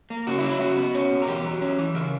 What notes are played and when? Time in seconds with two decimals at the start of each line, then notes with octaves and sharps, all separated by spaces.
0.10 A#3
0.27 C#3 F#4
0.38 E4
0.44 F#3
0.50 E4
0.61 C#3 F#4
0.77 B3
0.94 C#4
1.11 B2
1.22 A#4
1.27 E2 G4
1.44 F#3
1.61 C#4
1.78 E3
1.94 C#3 A#4